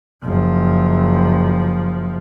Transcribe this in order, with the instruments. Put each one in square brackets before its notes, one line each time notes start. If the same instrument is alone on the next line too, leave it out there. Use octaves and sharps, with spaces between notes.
[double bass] F#1 F3